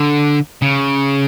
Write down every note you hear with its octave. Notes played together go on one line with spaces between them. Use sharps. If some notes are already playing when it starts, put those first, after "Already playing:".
Already playing: D3
C#3